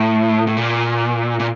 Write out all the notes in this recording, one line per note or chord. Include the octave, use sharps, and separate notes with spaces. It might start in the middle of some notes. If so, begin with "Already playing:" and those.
Already playing: A2
A2
A#2
A#2